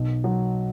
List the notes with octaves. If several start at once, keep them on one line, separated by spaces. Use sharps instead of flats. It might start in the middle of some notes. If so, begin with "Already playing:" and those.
Already playing: B1
F#3